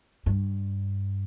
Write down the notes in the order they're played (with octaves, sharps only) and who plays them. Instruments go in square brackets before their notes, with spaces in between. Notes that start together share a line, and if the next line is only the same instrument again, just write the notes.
[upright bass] G2